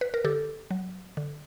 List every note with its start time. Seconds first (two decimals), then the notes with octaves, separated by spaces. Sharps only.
0.01 B4
0.14 A#4
0.24 D3 G4 A4
0.71 F#3
1.17 D3